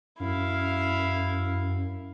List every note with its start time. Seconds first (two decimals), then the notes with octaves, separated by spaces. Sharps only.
0.20 F#2 E4 F5